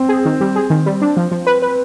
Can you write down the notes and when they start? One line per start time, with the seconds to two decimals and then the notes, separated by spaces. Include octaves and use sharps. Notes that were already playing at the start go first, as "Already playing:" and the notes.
Already playing: C4
0.09 G#4
0.25 D#3
0.41 G3
0.56 G#4
0.70 D#3
0.86 G3
1.02 D4
1.17 F3
1.31 F3
1.47 B4
1.62 B4